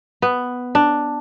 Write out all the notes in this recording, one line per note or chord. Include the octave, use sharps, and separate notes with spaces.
B3
D4